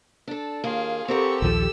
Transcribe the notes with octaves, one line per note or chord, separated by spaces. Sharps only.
D4 A4
D#2 A#3 F4 G#4
C4 G4 A4 A#4 F#5 C#6
A#1 D#2 F3 E6